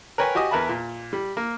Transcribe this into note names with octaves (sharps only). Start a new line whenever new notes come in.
A#4 B4 C#5 G5 G#5
F#4 G4 D#5 G#5 D#6
E2 A#4 B4 E5 A5 B5
A#2
G3
A#3